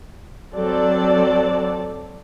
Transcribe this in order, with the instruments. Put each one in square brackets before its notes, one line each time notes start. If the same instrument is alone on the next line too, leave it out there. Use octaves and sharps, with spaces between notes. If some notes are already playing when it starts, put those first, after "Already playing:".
[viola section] F#3 C4 A4 D5